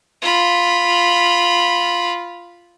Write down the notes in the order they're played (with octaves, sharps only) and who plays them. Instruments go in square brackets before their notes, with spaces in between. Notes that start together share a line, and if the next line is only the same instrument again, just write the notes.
[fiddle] F4 B5